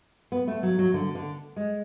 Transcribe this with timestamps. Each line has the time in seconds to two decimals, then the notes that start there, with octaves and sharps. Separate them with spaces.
0.32 B3
0.47 A3
0.63 F#3
0.79 F#3
0.94 D3
1.15 D3
1.56 G#3